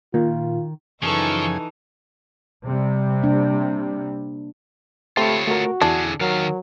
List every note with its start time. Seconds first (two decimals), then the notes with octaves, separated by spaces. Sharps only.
0.14 A#2 D#3 F4
1.02 F#2 C#3 E3 F3 D#4 G#4 A4 C#6
2.64 C3 G3
3.22 A#3 D4
5.17 A3 C4 F4 G4 C#5 B5
5.47 A3 F#4 A#4
5.82 E2 D3 D4 E4 G#4
6.21 D#3 F#3 A#4 F5